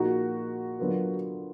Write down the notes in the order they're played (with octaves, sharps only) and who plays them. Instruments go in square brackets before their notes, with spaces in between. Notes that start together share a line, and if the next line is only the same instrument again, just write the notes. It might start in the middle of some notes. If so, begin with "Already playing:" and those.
Already playing: [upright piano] A#2 F3 A#3 F4 G#4 [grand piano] D#4 F#4
[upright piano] D3 F#3 B3 F4 A#4